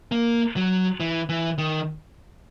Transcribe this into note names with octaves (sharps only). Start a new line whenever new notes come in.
A#3
F#3
E3
E3
D#3